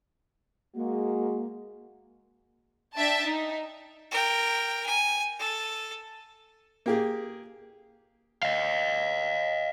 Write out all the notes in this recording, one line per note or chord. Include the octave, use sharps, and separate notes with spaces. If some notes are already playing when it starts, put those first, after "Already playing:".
G#3 A#3 F#4
D4 E5 G5 A5
D#4
A#4 G5
G#5
A4
A#3 G4 G#4
D#5 F5